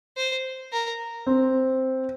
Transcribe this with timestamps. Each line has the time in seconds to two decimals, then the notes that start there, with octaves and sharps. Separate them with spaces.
0.17 C5
0.72 A#4
1.27 C4